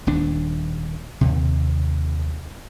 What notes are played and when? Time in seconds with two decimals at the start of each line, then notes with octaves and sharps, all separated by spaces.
0.07 D#1 D#2 D4
1.21 D#2 C3